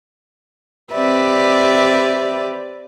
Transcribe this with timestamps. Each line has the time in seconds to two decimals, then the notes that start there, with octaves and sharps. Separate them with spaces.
0.93 C4 G4 B4 D5 E5